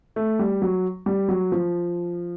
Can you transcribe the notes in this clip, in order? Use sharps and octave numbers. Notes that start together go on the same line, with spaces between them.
A3
G3
F#3
G3
F#3
F3